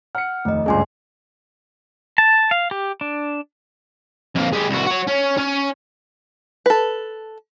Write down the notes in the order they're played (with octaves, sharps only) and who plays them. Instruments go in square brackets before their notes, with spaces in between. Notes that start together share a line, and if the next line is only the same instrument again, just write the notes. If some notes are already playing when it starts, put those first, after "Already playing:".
[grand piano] F#5 C#7 [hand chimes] F6
[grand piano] F1 D#2 [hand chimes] A3 D#5
[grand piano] G1 C#2 G2 [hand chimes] G#4 G#5 C6
[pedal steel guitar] A5
F5
G4
D4
[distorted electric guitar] F2 A#3
G#3 G4
C2 F#4
F#4 C#5
C#4
C#4
[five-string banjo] A4 B4